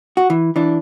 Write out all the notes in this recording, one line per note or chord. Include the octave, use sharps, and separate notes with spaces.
F#4
E3
E3 D4